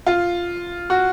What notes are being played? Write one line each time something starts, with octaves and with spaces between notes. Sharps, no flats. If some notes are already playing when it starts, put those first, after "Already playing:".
F4
F#4